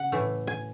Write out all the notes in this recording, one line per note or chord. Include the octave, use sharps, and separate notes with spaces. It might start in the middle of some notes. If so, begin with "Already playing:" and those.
Already playing: C#3 F#5
A2 E3 A3
G#5